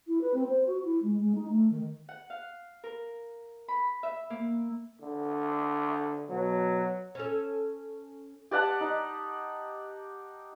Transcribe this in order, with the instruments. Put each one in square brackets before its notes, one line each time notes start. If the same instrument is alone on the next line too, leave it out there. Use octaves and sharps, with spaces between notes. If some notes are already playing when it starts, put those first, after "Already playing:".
[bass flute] E4
B4
C4
C5
F#4
E4
G#3
G#3
D#4
A3
D#3
[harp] F#5
F5
A#4
B5
E5
A#3
[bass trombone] D3
[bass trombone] B2 [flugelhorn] F#3
[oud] C#4 A4
[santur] G4 D5 F#5 A5
D#4